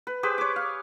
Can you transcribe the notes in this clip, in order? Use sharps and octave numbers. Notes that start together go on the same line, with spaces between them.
B4
G4 G#4 B4 C5
C#5 D6
F5